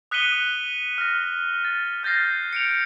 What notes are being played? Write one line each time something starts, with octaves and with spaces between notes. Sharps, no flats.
D#6 F#6 B6 C#7 D#7 G7
F6 A#6
A6
F6 G6 A6 A#6 C7
C#7 D7 F7